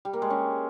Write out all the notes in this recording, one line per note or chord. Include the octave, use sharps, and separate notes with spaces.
G3
A#3
G#3
C#4